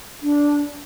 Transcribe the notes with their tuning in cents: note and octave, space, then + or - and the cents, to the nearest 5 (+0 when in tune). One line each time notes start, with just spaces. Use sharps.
D4 -10